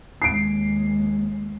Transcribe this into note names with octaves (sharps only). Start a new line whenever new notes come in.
D#2 G#3 C7 D7